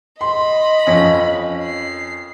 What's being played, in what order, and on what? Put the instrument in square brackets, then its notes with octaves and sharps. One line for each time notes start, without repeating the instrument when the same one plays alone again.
[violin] D#5 B5 [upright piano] C6
[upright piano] F2 C#4 A#6
[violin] C7